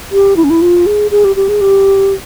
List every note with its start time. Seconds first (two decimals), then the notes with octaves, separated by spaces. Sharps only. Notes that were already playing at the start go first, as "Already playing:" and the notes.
0.12 G4
0.36 E4
0.44 C#4
0.50 E4
0.62 F4
0.86 G#4
1.11 G#4
1.25 G4
1.36 G4
1.49 G#4
1.61 G4